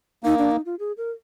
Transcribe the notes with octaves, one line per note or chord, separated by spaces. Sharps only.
A#3 D#4
D4
D#4
F4
G#4
A#4